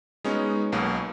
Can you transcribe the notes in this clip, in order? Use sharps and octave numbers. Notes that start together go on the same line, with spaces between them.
G#3 B3 C#4 D#4 F#4
B1 B2 A#3